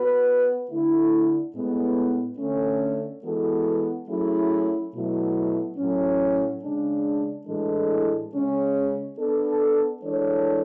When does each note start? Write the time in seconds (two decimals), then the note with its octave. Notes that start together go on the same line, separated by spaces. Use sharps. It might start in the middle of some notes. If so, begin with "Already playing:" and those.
Already playing: B3 F#4 B4
0.68 D3 A3 E4
1.54 A2 G#3 B3
2.38 D3 A3 C#4
3.23 E3 G#3 B3 F#4 A4
4.08 F#3 A3 C#4 E4 G#4
4.92 B2 F#3 A3 E4
5.77 A2 F#3 C#4
6.63 C#3 G#3 D4
7.47 A2 E3 G#3 D4 A4
8.33 C#3 G#3 C#4
9.16 B3 D4 A4
10.01 E3 G#3 D4 A4 C#5